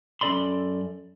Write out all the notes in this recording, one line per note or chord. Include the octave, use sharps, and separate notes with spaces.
F#2 C#4 A4 D5 B5 C6